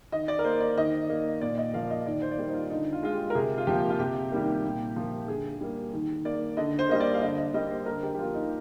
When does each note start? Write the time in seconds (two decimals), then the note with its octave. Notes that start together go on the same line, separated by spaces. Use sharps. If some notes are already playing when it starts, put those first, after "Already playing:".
0.12 D#3 D#5
0.28 D5
0.39 A#4
0.44 A#3 C5
0.61 D5
0.77 D#3 D#5
1.09 A#3
1.41 A#2 D5
1.58 D#5
1.73 F3 A#3 F5
1.90 D#5
2.06 D#3 D5
2.22 C5
2.32 D5
2.38 G3 A#3 C5
2.49 D#4
2.54 F4
2.70 D3 D#4
2.93 F4
3.03 G#3 F4
3.14 G4
3.30 A#4
3.35 C3 G#4
3.58 F4
3.67 F3 A#3 G4
3.90 F4
3.99 C3 G4
4.31 D#3 G3 A#3
4.64 A#2
4.96 F3 A#3
5.28 D3 G#4
5.61 G3 A#3
5.93 D#3
6.25 A#3 D5
6.57 D3 D#5
6.79 C5
6.89 G3 A#3 D#5
7.00 D5
7.14 F5
7.22 D3 D#5
7.37 D#5
7.54 G3 A#3 D#5
7.71 C5
7.86 D3 A#4
8.03 G4
8.14 G4
8.19 F3 A#3 F4
8.34 D#4